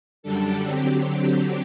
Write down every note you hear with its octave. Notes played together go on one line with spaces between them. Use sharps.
F#2 D3 G3 D4 A4
D3 F#3 C4 G4